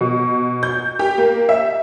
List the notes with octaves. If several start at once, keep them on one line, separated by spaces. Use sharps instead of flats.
B2
G6
G4
A#3
E5